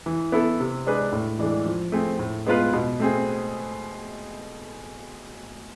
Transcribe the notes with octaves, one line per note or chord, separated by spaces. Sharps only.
E3
B3 E4 A4
C3
G#3 D4 G#4 B4
A2
E3 G#3 D4 A4
F3
A3 C4 G#4
A2
G#3 B3 F4 B4
B2
A3 C4 G#4